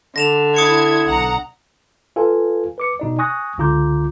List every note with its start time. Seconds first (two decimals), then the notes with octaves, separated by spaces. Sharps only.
0.16 D3 A#6 E7 F7
0.56 E4 D#6 G#6 C#7
1.06 B1 F#5 A#5
2.16 F4 A4 B4 F5 G#5
2.78 B4 D6 C#7
3.00 B2 D#4 D5
3.19 G#5 C#6 D#6 F#6 A#6
3.58 C#2 D3 F4 A#5 D6 G6